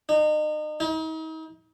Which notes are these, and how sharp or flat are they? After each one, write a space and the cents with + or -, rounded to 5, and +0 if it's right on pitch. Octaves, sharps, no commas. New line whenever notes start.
D#4 -35
D#4 +40